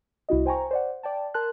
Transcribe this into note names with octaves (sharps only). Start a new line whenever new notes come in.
C2 E4 F#4 D#5
C5 G5 G#5 A#5 C#6
C5 D5 F#5
D5 G5 A5
A#4 A5 C6 F#6